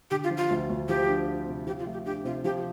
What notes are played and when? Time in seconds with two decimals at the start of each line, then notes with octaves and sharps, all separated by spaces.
0.11 D3 G4
0.24 F4
0.30 F3
0.37 F4
0.50 D2
0.70 D2
0.88 F3 G4
1.09 D4
1.27 F4
1.47 C3
1.67 F3 G4
1.79 F4
1.87 A3
1.93 G4
2.05 D4 G4
2.25 C3 F4
2.44 F3 G4